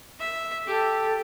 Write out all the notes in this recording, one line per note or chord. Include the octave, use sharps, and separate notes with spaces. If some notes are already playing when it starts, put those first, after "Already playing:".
E5
G4 A4